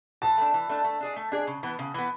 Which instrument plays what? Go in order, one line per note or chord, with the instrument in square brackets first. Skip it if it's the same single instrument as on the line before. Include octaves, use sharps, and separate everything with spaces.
[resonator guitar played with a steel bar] E3 [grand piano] A5
[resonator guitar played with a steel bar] A3 D4
E3
A3 D4
A3
D4 G#4 D5
A3
D4 G#4 D5
C#3
E3 B3
C#3
E3 B3